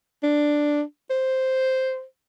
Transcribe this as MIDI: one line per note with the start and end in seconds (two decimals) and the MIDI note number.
0.23 0.82 62
1.10 2.03 72